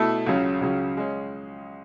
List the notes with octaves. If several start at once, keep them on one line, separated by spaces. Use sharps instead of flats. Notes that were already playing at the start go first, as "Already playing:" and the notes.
Already playing: B2 A3 E4 A4
C#2 C#3 F#3 C#4
C#2 C#3 F#3 C#4
G#3 C#4